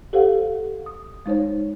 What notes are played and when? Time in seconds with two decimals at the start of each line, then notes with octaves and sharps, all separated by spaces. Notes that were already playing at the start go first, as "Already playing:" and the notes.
0.13 G4 A4 C5 F5 F#5
0.86 D#6
1.26 G#3 D#4 C5 C#5